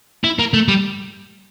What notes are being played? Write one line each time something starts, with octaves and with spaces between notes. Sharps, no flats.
E4
A#3
A3
G3